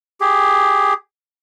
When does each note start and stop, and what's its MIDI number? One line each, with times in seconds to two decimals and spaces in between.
0.21 0.94 67
0.21 0.94 68